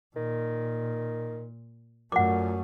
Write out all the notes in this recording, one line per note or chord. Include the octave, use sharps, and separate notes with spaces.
A#2 D#3
F#2 A#2 A3 F#5 D6